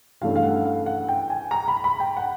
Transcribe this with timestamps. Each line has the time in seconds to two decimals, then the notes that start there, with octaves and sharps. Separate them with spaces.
0.21 G2 E3 A3 C#4 F5
0.36 F5
0.43 F#5
0.65 F5
0.86 F#5
1.09 G5
1.30 G#5
1.51 A#5
1.68 B5
1.84 B5
2.00 G5
2.17 F#5